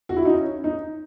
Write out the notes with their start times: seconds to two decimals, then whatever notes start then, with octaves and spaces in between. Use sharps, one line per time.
0.09 F#4
0.17 E4
0.25 D#4
0.33 C#4
0.64 D#4